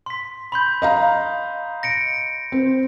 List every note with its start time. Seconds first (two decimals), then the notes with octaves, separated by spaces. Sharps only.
0.06 C6 B6
0.52 B5 C6 G6
0.82 D#5 F5 A#5
1.83 A#6 C#7 D7
2.52 C4